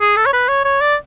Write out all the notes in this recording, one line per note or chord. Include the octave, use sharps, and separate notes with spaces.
G#4
A4
C#5
B4
C#5
C#5
D5